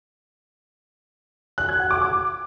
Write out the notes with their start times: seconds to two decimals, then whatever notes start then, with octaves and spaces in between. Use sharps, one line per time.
1.58 F#6
1.69 G#6
1.80 F#5
1.91 D6
2.02 D6